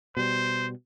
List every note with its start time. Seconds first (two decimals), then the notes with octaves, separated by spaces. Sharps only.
0.17 B2 G3 C5